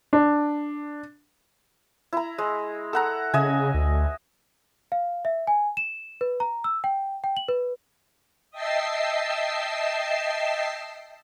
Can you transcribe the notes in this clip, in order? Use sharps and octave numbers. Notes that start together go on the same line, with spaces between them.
D4
E4 A#5
G#3
A4 F#5 A#5
C#3 D#5 E5 G#5
D2
F5
E5
G#5
E7
B4
A#5
E6
G5
G5
F#7
B4
D#5 E5 G5 A5 E6 C7